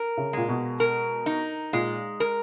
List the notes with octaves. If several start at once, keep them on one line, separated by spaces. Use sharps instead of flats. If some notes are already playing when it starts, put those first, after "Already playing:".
Already playing: A#4
C#3
A#2 G#3
B2
A#4
D#4
A#2 G#3
A#4